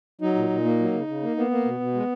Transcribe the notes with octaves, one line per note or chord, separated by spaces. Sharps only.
F#3 D#4
A#2
A#2
A#3
F#3
C#3
C#3
A#3
A#3 B3
A#3
B2
B2
G#3